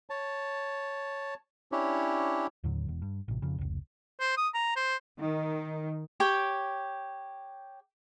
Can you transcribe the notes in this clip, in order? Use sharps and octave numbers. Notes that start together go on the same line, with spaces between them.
C#5 A5
C#4 D4 E4 G4 C#5
D#2 A2 D3 F#3
E1 E2
G2
A1 C3
F2 C#3
F1 C#2
C5
D#6
A#5
C5
D#3
G4 C#5 G5